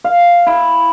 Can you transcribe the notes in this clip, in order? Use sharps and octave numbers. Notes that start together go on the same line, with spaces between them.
F5
E4